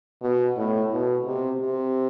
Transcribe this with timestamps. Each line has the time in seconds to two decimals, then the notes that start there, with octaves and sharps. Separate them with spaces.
0.23 B2
0.57 A2
0.92 B2
1.26 C3
1.60 C3